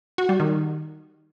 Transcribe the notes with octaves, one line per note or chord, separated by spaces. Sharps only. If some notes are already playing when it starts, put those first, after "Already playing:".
F#4
G3
D#3